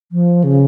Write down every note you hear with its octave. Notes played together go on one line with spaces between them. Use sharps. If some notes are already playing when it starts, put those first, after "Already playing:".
F3
C#3